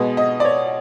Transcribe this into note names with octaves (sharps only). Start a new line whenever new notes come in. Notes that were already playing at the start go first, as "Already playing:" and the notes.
Already playing: B2 G#3 B3
D#5
D5
C#5